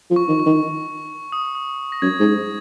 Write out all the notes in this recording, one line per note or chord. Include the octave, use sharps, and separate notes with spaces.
F3
C#6
D#3
C#6
D#3
D#6
D#6
A#6
F#2 G#6
G#2